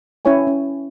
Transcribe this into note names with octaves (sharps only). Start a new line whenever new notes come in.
C#4 E4 C#5 G5 G#5
C#4